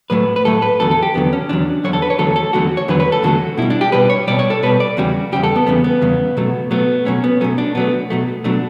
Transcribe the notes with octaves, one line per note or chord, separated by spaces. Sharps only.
A2 F#3 A3 B4
B4
A2 F#3 A3 A4
B4
E2 D3 F#3 A4
A4
G4
E2 D3 F#3 B3
C#4
E2 D3 F#3 D4
E2 D3 F#3 C#5
A4
B4
C#5
E2 D3 F#3 A3 A4
A4
E2 D3 F#3 A3 F#4
C#5
E2 D3 F#3 A3 B4
B4
A4
E2 D3 F#3 A3 F#4
B2 G3 E4
D4
G4
B2 G3 B4
C#5
B2 G3 D5
C#5
A4
B2 G3 B4
D5
E2 C#3 G3 F#4
E2 C#3 G3 G4
A4
B3
E2 C#3 G3 B3
B3
E2 C#3 G3
B2 F#3 A3
B2 F#3 A3 B3
B2 F#3 A3 C#4
B3
B2 F#3 A3 C#4
D4
B2 F#3 A3 B3
B2 F#3 A3
B2 F#3 A3 D4